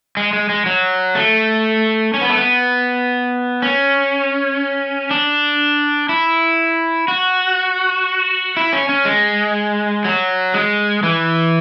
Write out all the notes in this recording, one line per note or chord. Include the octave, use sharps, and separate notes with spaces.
G#3
G#3
G#3
F#3
A3
C#4
B3
A3
B3
C#4
D4
E4
F#4
E4
C#4
C#4
G#3
F#3
G#3
E3